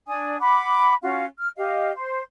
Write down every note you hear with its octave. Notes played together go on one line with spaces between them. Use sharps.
D4 D5 G#5 D#6
F#5 B5 D6
C#4 F4 F#4 F5
F6
G4 D#5 F5
C5